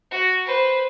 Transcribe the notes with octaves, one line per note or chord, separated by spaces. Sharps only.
F#4
B4 C5